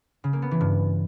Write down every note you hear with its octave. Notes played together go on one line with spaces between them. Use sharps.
C#3
A#3
B3
E3
G2